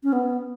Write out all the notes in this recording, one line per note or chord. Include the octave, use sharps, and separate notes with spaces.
C#4
B3